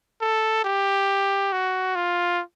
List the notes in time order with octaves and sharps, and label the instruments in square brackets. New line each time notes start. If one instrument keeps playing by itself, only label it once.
[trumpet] A4
G4
F#4
F4